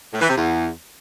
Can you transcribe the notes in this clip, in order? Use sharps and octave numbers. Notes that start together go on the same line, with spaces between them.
A2
E3
C3
E2